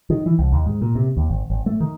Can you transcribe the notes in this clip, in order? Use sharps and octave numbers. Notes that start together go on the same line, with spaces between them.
D#3
E3
C2
D#2
G#2
A#2
C3
D#2
G#1
G#1
A3
D#3